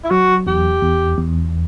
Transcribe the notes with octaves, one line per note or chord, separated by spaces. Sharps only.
E4
F#3 F#4
E2 G4
E2
E2